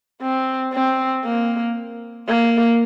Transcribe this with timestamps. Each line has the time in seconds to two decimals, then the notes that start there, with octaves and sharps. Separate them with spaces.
0.22 C4
0.73 C4
1.25 A#3
2.28 A#3